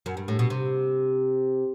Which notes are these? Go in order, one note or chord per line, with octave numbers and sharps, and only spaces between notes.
F#2
G2
A2
B2
C3